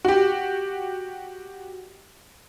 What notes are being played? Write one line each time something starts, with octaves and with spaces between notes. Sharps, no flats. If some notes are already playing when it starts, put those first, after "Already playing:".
F#4 G4